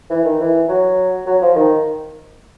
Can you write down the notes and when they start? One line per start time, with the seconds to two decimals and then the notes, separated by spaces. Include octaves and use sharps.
0.10 E3
0.25 D#3
0.40 E3
0.69 F#3
1.26 F#3
1.42 F3
1.55 D#3